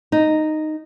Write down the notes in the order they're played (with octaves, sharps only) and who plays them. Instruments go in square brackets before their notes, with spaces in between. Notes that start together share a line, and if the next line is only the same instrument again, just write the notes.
[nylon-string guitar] D#4